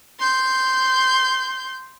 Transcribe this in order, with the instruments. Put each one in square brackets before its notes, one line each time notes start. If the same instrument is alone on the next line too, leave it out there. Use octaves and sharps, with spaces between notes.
[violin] C6 G6